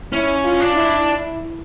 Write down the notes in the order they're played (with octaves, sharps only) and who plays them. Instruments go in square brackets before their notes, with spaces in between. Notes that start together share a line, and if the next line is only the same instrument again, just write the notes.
[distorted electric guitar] C#4 [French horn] E4
[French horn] F4
[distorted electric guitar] D4
[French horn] E4
E4